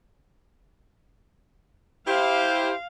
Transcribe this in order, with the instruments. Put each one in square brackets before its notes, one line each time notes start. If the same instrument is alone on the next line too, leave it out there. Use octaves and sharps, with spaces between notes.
[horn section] E4 G4 C5 [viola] F5